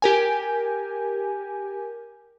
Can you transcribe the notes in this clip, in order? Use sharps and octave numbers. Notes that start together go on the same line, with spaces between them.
G4 A#4 G#5